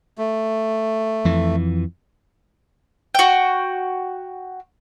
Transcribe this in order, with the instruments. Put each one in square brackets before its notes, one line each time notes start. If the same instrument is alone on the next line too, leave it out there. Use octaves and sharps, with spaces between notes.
[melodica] A3
[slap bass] F2 E3
[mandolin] F#4 G5